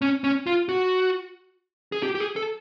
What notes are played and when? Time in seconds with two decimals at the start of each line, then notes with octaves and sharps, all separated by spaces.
0.02 C#4
0.24 C#4
0.46 F4
0.69 F#4
1.92 G#4
2.03 G4
2.15 G4
2.20 G#4
2.36 A4